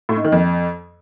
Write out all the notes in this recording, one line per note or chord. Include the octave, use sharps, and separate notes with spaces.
A2
G#2
D#3
F2